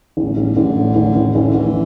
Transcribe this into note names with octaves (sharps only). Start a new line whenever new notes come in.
A1 E2
A1 G2
A1 D3
A2
A1
A1
A1 E3
D3
A1 E3